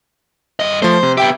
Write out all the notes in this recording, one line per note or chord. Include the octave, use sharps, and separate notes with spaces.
G2 D#5
F3 A3 C5
C3
B3 G4 E5 G5